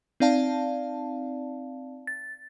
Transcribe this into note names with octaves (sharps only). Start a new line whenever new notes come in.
C4 D#4 D5 F5 A5
A6